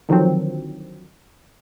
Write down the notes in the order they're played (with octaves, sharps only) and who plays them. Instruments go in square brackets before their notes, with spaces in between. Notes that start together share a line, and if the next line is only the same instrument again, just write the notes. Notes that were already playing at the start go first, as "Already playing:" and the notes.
[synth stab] D3 D#3 F3 F#3 C4